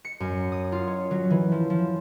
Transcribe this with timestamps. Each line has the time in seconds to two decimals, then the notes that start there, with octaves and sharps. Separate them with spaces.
0.05 C#7
0.20 F#2
0.52 D#6
0.72 F4
0.87 C#5
1.11 F#3
1.30 E3
1.52 F3
1.70 F3